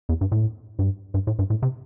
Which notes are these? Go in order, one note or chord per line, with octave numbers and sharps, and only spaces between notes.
E2
G2
A2
G2
G2
A2
G2
A2
C3